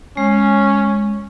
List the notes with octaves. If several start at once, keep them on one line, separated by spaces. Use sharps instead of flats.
G#3 C#4